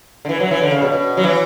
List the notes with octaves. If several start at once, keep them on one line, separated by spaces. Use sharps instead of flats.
D3
E3
F#3
E3
D3
C#3
B2
B2
F#3
E3